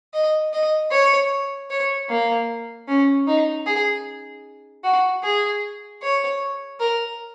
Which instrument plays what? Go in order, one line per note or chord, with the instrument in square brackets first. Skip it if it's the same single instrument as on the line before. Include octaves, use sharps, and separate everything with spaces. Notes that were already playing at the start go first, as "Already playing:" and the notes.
[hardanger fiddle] D#5
D#5
C#5
C#5
A#3
C#4
D#4
G#4
F#4
G#4
C#5
A#4